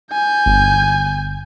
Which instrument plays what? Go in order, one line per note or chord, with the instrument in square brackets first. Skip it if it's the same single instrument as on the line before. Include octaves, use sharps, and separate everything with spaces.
[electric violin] G#5 G6
[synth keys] G1